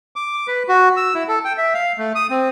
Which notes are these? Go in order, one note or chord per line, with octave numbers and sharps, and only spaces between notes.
D6
B4
F#4
E6
E4
A4
G5
E5
F5
A3
D#6
C4